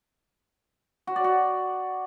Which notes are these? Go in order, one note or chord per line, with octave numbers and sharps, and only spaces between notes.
F#4
D5
F#4